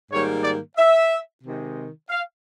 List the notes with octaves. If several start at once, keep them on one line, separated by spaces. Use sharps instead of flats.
G#2 D#3 G3 A#3 C#5
D5
E5
C3 D#3 G#3
F5